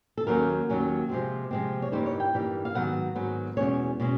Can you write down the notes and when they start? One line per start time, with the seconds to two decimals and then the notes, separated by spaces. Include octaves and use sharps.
0.17 A4
0.27 D#2 D#3 F#3 A#3 C#4 A#4
0.69 D#2 D#3 F#3 A#3 C#4
1.09 C3 F3 G#3 C4
1.51 C3 F3 G#3 C4
1.82 C#5
1.92 G2 E3 G3 A#3 D#4 C5
2.06 C#5
2.20 G5
2.34 G2 E3 G3 A#3 D#4
2.65 F5
2.75 G#2 D#3 F#3 B3 F#5
3.15 G#2 D#3 F#3 B3
3.57 E2 B2 G#3 C#4 C#5
4.00 B2 G#3 C#4